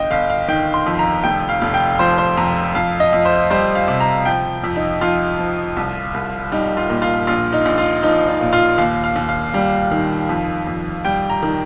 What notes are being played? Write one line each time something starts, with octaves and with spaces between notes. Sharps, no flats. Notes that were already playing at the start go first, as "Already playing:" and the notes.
Already playing: G1 D#5 G5
G1 F5
F5
D#3 G5
C6
F2
A#5
F1 G5
F5
F1
G5
F3 C5
C5
F2 A#5
F2 F5
D#5
F2
C5
G3 C5
F5
C3
A#5
F3 G5
F2
D#4
F2 F4
F3
C2
C2
G3 D#4
F4
A#2
F4
A#1 F4
D#4
A#1
F4
F3 D#4
D#4
A#2
F4
D#2 F5
F5
D#2
F5
G3
D#3
F2
F2
G3 G5
A#5
D#3